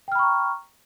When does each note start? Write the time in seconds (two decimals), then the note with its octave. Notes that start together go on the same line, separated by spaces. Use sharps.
0.08 G5
0.12 F6
0.15 B5
0.19 C#6
0.23 A#5